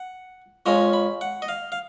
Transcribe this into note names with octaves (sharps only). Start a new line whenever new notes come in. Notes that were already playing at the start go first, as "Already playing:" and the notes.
Already playing: F#5
F2 F3 G#3 C#4 A#5
B5
F#5
D#5
F5
F5